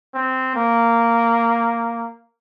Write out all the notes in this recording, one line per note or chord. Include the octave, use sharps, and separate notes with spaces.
C4
A#3